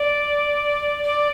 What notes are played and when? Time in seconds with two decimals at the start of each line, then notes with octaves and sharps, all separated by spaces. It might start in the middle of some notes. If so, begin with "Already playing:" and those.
Already playing: D5
1.03 D5